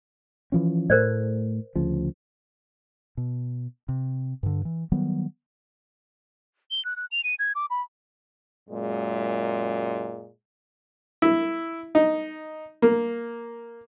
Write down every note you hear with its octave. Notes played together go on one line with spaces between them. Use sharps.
E3 F3 C#4
A2 A3 A#4 C5 D5
D2 C#3 F3
B2
C3
G2 D3
E3
D#3 F#3 G3 B3
G7
F#6
F#6
F7
D#7
G#6
D6
B5
F#2 A#2 G#3
E4
D#4
A#3